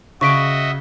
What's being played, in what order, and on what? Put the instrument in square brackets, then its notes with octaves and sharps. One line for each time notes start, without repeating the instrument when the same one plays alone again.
[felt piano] C#3 [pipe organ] F#4 D#5 E5 [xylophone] C#6 B6 D7